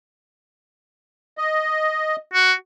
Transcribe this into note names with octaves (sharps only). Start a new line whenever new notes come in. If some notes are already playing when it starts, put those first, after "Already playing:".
D#5
F#4